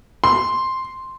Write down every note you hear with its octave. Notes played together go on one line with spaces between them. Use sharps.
C6